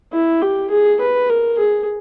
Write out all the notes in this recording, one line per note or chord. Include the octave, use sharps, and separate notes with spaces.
E4
G4
G#4
B4
A#4
G#4